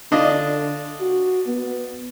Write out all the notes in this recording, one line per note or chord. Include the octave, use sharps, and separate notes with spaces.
D3 D4 F4 D#5
F#4
B3